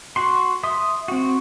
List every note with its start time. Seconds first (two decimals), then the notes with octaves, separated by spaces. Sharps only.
0.16 F#4 C6
0.63 E5 C6 D#6
1.08 C4 F#4